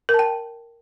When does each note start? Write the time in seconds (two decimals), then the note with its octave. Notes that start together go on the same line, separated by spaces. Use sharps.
0.09 A#4
0.14 A5
0.19 G5